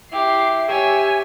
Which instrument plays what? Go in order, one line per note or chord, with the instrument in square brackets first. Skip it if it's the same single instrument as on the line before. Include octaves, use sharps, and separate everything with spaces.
[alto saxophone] E4 [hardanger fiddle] G4 [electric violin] C7
[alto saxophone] G4 [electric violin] C#5 G#5 [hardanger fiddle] E5